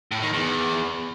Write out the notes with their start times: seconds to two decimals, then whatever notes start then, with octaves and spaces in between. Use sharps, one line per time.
0.11 A2
0.23 D#3
0.34 E2